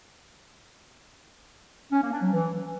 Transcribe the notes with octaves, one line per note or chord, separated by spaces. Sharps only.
C#4
A#3
D4
F#3
E3